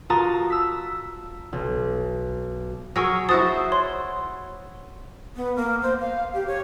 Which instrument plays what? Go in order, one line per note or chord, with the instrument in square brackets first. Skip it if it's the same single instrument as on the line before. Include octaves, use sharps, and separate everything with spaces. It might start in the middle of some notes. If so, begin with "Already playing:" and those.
[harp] F4 F#4 A#4 A5 A#5 D#6
E6 B6
B1
[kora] F#3 G#4 A#4 [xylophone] C#6 E6 A#6
[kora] E4 F#4 C5 [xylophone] A5 D#6 A6
[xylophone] C#5 C6
[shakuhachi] B3
A#3
C5
F5
G4
C#5